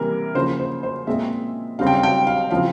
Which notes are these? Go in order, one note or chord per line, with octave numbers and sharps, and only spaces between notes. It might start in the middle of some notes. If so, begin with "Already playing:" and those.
Already playing: C3 E3 G3 A#3 A#4
C#3 F3 A#3 C5
C5
C5
A#2 G#3 C4 E5
C#3 G3 C4 F5
G5
F5
G5
F5
C#3 F3 C4 F5